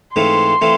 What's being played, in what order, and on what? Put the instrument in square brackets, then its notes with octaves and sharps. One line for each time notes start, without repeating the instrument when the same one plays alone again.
[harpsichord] G#2 E3 A3 C4 F4 [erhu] C6
[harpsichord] E3 A3 C4 F4